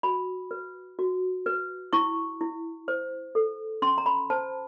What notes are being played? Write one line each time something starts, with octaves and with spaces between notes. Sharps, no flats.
F#4 B5
B4
F#4
B4
E4 C#6
E4
C5
A4
C#4 C6
A#5
B5
C5 A5